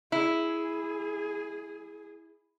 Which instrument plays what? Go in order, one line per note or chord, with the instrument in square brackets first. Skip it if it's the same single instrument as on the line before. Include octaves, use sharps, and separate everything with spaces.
[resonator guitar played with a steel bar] E4 [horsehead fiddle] G#4